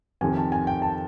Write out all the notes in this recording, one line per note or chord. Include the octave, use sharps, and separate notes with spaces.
F2 C3 D#3 G#5
A5
G#5
G5
A5